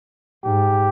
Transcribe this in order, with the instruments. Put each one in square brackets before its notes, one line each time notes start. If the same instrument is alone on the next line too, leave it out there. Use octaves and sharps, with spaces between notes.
[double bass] G#2 [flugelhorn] G4